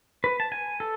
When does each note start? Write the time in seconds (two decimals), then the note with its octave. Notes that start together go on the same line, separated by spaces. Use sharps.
0.24 B4
0.40 A5
0.52 G#5
0.80 A4